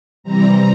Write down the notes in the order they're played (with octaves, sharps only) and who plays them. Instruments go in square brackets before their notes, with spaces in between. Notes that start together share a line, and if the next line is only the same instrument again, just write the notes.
[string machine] C3 E3 G3 C4 A#5